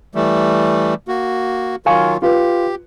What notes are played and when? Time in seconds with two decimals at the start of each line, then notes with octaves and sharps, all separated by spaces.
0.15 E3 G3 A3
1.08 A#3 F#4
1.86 D#3 F#3 F4 F5 G#5 C#6
2.22 F4 G4 B4